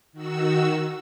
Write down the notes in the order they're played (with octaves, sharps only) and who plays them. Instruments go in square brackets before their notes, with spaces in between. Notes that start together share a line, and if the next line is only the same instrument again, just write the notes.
[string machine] D#3 F#4 E6